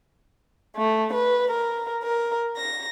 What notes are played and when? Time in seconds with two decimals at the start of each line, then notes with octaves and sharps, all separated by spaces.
0.77 A3
1.14 B4
1.51 A#4
2.03 A#4
2.57 A#6